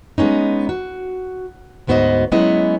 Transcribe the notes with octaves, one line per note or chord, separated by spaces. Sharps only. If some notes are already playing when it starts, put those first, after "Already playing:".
G#3 B3 C#4 D#4
F#4
D2 G#2 B3 F#4 C5 D#5
F#3 G#3 B3 C#4 E4 D#5